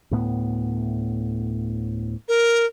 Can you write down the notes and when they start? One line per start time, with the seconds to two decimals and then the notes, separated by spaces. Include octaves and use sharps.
0.11 D2 A2 B3
2.28 A#4